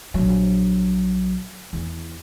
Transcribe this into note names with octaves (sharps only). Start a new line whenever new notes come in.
A#1 F#3
E2